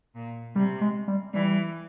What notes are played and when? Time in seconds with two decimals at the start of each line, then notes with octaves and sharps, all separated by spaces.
0.15 A#2
0.55 C3 G3
0.81 G#3
1.08 G3
1.34 E3 G3